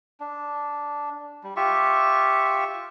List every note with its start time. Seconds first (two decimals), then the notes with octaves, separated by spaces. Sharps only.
0.20 D4
1.43 G3
1.56 F4 G4 E5 C#6